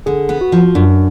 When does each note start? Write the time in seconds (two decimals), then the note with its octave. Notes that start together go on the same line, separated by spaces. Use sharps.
0.06 D3 G#4
0.29 B3
0.41 F#4
0.52 F3
0.75 F#2 D4